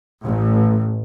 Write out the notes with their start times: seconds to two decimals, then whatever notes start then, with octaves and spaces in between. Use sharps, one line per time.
0.24 A1